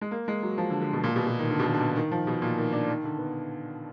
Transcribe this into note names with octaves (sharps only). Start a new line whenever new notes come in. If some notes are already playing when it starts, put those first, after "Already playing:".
G#3
A#3
G#3
F#3
F3
D3
D3
B2
A#2
B2
B2
D#3
D3
B2
A#2
D3
B2
D3
D#3
F3
B2
A#2
D#3
D4
D#3
D3
B3